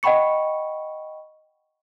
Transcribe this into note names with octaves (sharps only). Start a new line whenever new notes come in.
D#5 F#5 G5 B5 C#6 C#7